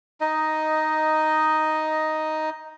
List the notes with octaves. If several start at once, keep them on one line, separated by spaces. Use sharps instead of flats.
D#4 D#5